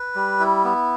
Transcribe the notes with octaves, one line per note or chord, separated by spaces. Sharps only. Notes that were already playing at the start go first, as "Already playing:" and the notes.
Already playing: B4
G3
E4
B3